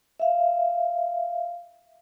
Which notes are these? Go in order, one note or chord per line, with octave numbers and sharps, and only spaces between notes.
E5 F5